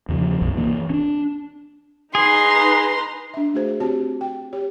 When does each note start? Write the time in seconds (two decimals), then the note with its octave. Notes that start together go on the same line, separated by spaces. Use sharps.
0.09 E2 C#3 E3 F3
0.41 C2 F#2 B2
0.57 E3 A#3
0.90 C#4 D4
2.15 D#4 G#4 B4 A#5 C6
3.34 D4 E5
3.54 A3 F#4 G#4 C5
3.80 C4 F#4 G4 C#5 A5
4.21 G5
4.53 G4 C#5